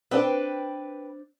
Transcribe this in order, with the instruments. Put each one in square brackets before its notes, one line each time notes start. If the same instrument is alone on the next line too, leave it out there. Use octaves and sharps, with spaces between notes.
[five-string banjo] C4 D4 [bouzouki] B4 G5